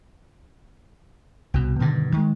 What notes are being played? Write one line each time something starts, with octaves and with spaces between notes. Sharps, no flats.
C2 B2
G2 B2 D3 D#3
D#3 G#3